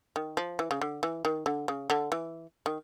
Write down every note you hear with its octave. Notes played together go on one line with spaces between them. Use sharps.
D#3
F3
E3
C#3
D3
E3
D#3
D3
C#3
D3
E3
D#3